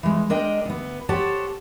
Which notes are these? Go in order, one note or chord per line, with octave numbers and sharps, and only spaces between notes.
E3 G#3
G#3 D4 A#4 D#5 G5
D2 B3
G4 A4 C5 C#5 F#5 A5